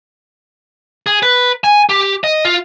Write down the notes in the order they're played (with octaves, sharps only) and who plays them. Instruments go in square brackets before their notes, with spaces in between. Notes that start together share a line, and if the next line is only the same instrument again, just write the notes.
[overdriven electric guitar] G#4
B4
G#5
G4
D#5
F4